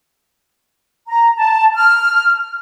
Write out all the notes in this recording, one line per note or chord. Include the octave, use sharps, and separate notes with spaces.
A#5
A5
F6